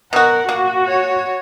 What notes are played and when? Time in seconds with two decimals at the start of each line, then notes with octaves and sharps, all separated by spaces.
0.13 B2 F#4 A#4 F#5
0.49 A#3 F#4
0.88 C#5